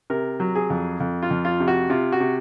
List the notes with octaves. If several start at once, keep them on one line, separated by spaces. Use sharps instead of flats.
C3 A#4
F#3
G#4
F2
F2
F4
F2
F4
C3
F#4
C3 F4
F#4
C3